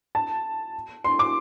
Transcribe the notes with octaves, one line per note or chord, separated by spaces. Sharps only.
A5
C6
D6